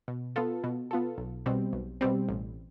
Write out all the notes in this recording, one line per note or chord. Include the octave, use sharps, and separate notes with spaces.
B2
B3 F4 A4
B2
B3 F4 A4
B1
B2 G3 C4
B1
B2 G3 C4
A1